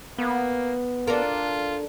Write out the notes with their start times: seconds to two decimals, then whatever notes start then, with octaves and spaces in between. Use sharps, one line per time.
0.18 A#3 B3
1.07 D4 F4 A4 A#4